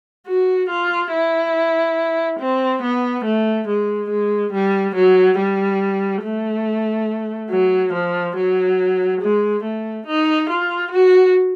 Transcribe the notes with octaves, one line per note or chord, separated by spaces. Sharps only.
F#4
F4
E4
C4
B3
A3
G#3
G#3
G3
F#3
G3
A3
F#3
F3
F#3
G#3
A3
D#4
F4
F#4